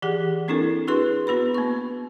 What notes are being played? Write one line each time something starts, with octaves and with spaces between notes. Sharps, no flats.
E3 G4 G#4 F#5
A#3 C4 D4 E4 A4 A#4
D4 F#4 G#4 B4 C6
B3 F#4 B4 B5
A#3 C#6